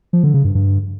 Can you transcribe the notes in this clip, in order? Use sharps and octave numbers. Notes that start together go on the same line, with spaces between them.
F3
D3
C#3
G2
G2